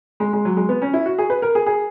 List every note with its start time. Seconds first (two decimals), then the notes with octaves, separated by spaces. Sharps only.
0.20 G#3
0.33 G#3
0.45 F#3
0.57 G#3
0.69 B3
0.82 C#4
0.93 E4
1.06 F#4
1.18 G#4
1.30 B4
1.42 A#4
1.55 G#4
1.66 G#4